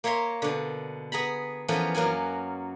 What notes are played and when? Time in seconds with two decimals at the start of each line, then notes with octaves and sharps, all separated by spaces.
0.04 A#3 C#5 E5 A#5 C6
0.42 B2 D3
1.12 B3 G#4 A#5 B5
1.68 E3 F3 B3 C#4 A4 A#4
1.94 F#2 F#3 A#3 A#4 G#5